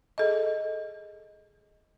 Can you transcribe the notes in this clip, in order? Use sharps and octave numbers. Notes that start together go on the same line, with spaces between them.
G#4 A4 D#5